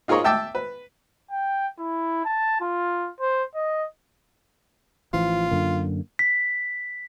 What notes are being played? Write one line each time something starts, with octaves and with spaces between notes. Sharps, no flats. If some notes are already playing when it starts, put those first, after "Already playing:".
D#4 F4 G#4 A#4 C#5 D#5
E5 G5 A5 D6 E6
B4
G5
E4
A5
F4
C5
D#5
A1 E3 F3 F4
F#2 D3 A#3
B6